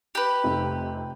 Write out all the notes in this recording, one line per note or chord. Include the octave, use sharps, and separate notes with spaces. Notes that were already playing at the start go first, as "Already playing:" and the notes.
G4 B4
F1 C3 D#4